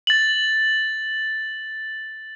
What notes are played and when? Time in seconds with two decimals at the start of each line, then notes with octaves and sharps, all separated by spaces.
0.07 A6 F#7